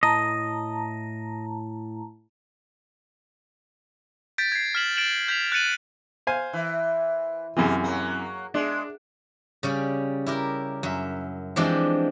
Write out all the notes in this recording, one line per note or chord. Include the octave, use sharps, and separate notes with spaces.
A2 D#5 A5 A#5
G6 A6 B6 D7
G#6 C7
F6 B6 E7 F#7
A6 D7 E7 F#7
G6 B6 F7
F#6 A6 C#7 D#7 F#7
C5 F5 G#5
E3
F#2 C3 E3 A#3 G#4
F#3 A#3
G#3 D4
C#3 G3 C#4
E4 G4 A#4
F#2 E5
E3 F3 G#3 C4 D4 G4